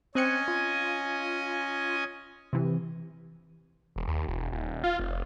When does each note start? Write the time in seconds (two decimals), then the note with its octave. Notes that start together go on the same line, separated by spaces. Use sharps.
0.15 C4 C#4 D#5 G#5 F#6 C#7
0.48 F4
2.53 C3 E3
3.96 E1
4.08 D#2
4.28 E1
4.52 D#1
4.84 F4
4.99 F1